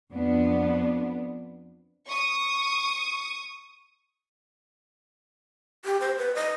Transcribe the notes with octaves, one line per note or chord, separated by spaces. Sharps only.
F2 B3 D4
C#6 D#6
G4
C5
B4
D#5